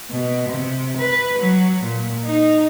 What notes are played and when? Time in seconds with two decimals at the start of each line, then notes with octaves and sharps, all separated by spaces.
0.11 B2
0.49 C3
0.97 B4
1.39 F#3
1.83 A#2
2.25 D#4